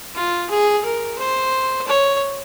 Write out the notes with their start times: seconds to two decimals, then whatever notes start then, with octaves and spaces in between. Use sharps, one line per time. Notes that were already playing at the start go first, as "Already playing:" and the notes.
0.15 F4
0.50 G#4
0.85 A#4
1.19 C5
1.87 C#5